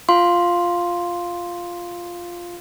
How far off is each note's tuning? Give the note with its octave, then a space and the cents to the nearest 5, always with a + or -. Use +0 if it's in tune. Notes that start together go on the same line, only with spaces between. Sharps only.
F4 +0 F5 +0 C6 +0